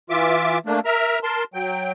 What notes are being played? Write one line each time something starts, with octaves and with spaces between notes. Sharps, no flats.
E3 F4 E5 D6
A3 A#3 D4
A#4 E5 A#5
A#4 A5 C6
F#3 G5